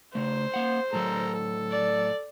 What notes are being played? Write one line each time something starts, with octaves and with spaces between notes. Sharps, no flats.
C#3 A3 C5
A#3 F#5
A2 F#3 A4 A#4 A#5
A4
D5